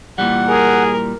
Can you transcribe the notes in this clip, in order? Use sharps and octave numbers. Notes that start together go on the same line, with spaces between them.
A#2 E3 G3 F#5
G#4 A#4